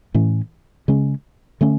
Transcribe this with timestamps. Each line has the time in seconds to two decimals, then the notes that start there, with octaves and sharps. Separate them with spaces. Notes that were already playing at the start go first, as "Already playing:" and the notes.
0.14 A2 E3 A3 C#4
0.88 C#3 G#3 C#4
1.61 D3 A3 C#4